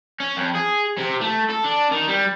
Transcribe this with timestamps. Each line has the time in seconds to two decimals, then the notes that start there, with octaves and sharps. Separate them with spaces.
0.20 C#4
0.37 F2
0.55 G#4
0.98 C3
1.21 A3
1.50 A4
1.64 D4
1.92 D#3
2.08 G3